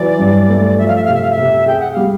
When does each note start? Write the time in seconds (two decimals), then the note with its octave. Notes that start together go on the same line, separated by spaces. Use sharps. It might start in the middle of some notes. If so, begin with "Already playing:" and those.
Already playing: E3 F#3 D5
0.19 G2
0.49 A3
0.78 F3 E5
0.88 F5
0.95 E5
1.05 C3 F5
1.14 E5
1.22 F5
1.31 E5
1.38 C3
1.66 G#4 G5
1.80 F#5
1.92 G3 F5